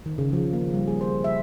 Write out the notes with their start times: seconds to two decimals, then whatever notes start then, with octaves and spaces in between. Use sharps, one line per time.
0.06 D#3
0.18 C#3
0.33 F3
0.53 A#3
0.74 G3
0.88 G#4
1.01 C5
1.24 E5